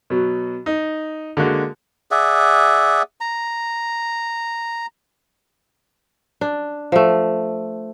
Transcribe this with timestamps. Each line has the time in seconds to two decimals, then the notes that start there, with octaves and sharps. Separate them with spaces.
0.10 B2 F#3
0.66 D#4
1.37 D3 G#3 A#3 F#4
2.11 G#4 D5 E5 F#5
3.21 A#5
6.41 D4
6.92 F3 A3